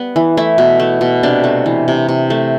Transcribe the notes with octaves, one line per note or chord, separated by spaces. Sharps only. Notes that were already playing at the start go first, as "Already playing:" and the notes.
Already playing: G3 B3
E3
A3 E4
B2
A3
B2
C3 D4
A3
E3
C3
C3
A3